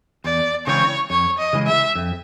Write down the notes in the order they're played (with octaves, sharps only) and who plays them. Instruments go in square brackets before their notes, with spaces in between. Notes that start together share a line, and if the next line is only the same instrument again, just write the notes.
[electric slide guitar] E2 [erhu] D5
[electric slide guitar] C#3 E3 G#3 C4 [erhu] C#5
[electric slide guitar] F2 [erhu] C#5
[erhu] D#5
[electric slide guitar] C#3 E3 G#3
[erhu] E5
[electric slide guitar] F2